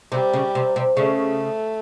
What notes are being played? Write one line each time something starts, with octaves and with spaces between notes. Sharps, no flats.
C3 G3
C#3
C3
C3
C#3 A3